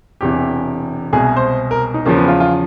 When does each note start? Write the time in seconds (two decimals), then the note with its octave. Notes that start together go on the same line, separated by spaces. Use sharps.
0.21 E1 E2 C3 E3 G4
1.13 C2 B2 G#3 G#4
1.37 C5
1.71 A#4
1.94 D#4
2.05 E2 C#3 F3 A#3
2.17 B3
2.28 F4
2.40 F4